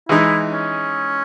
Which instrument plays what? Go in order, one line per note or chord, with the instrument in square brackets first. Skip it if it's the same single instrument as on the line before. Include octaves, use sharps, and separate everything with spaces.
[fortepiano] E3 G#3 D#4 [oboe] E4
[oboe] C#4